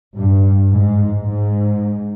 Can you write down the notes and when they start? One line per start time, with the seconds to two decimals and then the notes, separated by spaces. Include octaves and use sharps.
0.15 G2
0.70 G#2
1.23 G#2